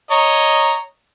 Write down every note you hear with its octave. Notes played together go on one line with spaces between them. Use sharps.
C#5 D#5 A#5